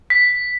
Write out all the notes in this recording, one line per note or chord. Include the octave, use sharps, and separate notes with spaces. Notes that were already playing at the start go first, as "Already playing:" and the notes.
B6